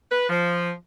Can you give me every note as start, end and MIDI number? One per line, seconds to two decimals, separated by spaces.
0.11 0.28 71
0.29 0.71 53